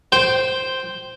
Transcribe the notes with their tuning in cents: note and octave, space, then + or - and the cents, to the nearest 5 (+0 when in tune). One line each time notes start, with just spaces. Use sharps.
C5 +0 G5 +0